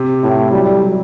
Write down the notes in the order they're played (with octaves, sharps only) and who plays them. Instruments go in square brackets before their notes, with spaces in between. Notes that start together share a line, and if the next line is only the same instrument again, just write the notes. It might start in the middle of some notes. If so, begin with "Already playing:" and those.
Already playing: [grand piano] C3
[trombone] A2 [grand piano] E4
[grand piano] F#3 [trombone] G3
[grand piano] F#3